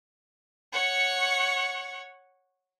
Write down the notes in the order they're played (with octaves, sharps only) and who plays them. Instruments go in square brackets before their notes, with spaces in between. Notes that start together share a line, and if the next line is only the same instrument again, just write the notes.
[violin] C#5 F#5